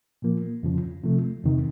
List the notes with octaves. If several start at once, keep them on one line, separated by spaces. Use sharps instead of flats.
A#2 F3 A#3
F2 C#3 F3
C3 F3 A3
E2 C3 D#3